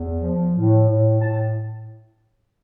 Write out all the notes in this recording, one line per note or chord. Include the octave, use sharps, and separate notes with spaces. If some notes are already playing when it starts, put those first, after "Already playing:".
Already playing: E2
F3
A2
A2
A2 A5